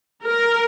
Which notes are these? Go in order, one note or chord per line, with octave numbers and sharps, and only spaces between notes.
A#4